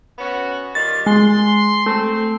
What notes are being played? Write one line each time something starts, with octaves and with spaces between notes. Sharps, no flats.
B3 C#4 F#4
D#3 G3 F4 A6
G#3 C6
A3 C4